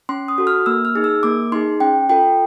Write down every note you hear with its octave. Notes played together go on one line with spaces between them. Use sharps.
C#4 C6
D#6
F#4 A4
F6
A#3 E6
F6
D#4 G#4
E6
A#3 D6
D#4 G#4 C6
C#4 G5
F4 A4 G5